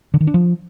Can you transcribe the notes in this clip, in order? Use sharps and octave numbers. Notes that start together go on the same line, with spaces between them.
D3
D#3
D4
F3